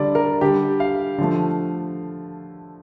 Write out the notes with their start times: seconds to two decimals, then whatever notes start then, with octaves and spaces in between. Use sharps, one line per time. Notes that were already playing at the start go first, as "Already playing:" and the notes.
Already playing: D3 G3 D5
0.15 A#4
0.41 D3 G3 G4
0.80 F5
1.18 D3 F3 A3